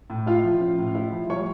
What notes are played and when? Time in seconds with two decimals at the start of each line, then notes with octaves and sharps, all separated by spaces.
0.10 A2
0.26 E4 F4 F5
0.44 F3
0.61 C#4
0.78 A2
0.95 E4
1.12 F3
1.29 G3 C#5 C#6